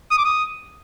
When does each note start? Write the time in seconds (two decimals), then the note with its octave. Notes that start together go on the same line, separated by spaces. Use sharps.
0.11 D#6
0.18 D6
0.25 D#6